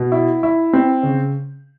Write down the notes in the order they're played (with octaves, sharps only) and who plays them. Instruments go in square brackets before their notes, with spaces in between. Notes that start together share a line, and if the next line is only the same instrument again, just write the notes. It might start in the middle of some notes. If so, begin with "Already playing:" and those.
Already playing: [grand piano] B2
E4
E4
C4
C#3